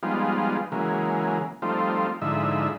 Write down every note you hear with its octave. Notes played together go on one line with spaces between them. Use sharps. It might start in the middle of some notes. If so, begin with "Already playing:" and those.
F3 G3 G#3 B3 D#4 F4
C#3 E3 F#3 G#3 A#3
F3 G3 A3 C4 D#4 F4
G#2 D3 F3 D#4 E4 E5